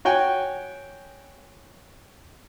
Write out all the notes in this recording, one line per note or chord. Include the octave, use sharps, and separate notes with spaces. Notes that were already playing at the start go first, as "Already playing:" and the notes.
F#4 C#5 G5 G#5